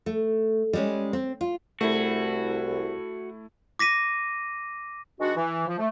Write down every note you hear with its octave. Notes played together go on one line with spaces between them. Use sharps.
A3
G3 G#3 C#4
C4
F4
C2 A3 E4 F#4
D6 A#6 B6 D#7
D#3 G#3 D4 F#4
E3
F3
A3